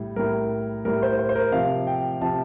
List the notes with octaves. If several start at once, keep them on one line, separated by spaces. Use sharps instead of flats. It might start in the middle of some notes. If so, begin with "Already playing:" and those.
Already playing: A2 G3
A2 G3 A#4
A2 G3 A#4
C5
C5
C5
A#4
C3 F3 F5
G5
C3 F3 A5